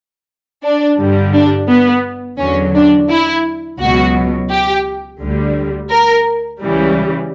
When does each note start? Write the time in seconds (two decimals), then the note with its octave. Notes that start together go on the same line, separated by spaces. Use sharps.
0.63 D4
0.98 G2 D3 G3
1.34 D4
1.69 B3
2.39 E2 D3 F#3 C#4
2.75 D4
3.09 E4
3.79 C#2 B2 F#3 F#4
4.51 G4
5.21 D2 D3 G3
5.91 A#4
6.62 C#2 C#3 E3 G3